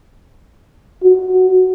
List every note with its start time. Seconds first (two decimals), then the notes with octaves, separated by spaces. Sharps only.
1.04 F#4